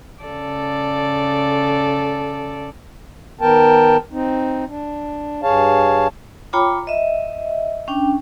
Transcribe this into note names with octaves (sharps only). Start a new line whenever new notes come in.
C#3 A4 D5
D#3 B3 A#4 G5 A5
C4 D#4
D4
G2 G#4 C#5 F5 A5
F4 C#5 G5 A#5 B5 D6
D#5 E5
C#4 D4 G5